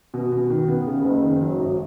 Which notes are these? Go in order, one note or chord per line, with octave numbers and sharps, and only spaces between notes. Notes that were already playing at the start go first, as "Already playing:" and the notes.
B2
B2
D#3
B3
C#3
F#1
D#3
F#3
G#1